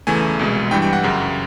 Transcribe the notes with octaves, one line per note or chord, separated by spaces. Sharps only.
E2 C#3 E3 A3 G#5
C2 B2 G#3
G2 E3 G3 G5
G5
F#5
F#2 C#3 F#3